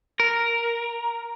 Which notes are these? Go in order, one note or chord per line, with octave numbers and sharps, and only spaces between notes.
A#4